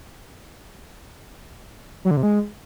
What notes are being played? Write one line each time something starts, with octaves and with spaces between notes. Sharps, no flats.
F#3
D3
C3
G#3